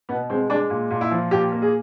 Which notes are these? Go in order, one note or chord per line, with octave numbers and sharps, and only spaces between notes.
B2 B3
G#3 C4
G#3 D4
A#2
A#2
E4
F3
A#2 G4
A#3
G#4